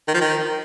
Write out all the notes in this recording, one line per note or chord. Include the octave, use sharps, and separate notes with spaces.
D#3
F3
D#3